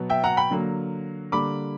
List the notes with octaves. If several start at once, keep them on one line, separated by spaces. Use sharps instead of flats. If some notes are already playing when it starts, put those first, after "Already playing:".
Already playing: B2 F#3 B3
E5 G5
F#5 A#5
G5 B5
D3 F#3 A#3
D3 G3 A#3 B5 D6